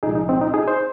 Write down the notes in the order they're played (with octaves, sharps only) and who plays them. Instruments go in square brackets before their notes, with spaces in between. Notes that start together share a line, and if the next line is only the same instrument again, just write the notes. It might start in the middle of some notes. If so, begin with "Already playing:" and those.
[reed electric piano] C2 A#2 F3 G#3 D#4 G#4
D#4
C4
D#4
D#4 G#4
C5